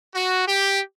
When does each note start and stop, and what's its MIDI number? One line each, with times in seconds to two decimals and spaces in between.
0.15 0.46 66
0.48 0.81 67